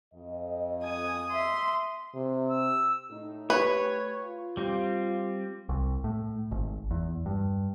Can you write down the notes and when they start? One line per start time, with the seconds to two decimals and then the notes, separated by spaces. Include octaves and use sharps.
0.13 F2 D#5
0.83 G#5 D#6
1.32 E5 C6
2.15 C3
2.48 E6
3.10 A2 D#4
3.50 A3 G4 B4 C#5
4.19 F4
4.57 G3 C4
5.69 C2
6.04 A2
6.51 G#1
6.91 E2
7.26 G2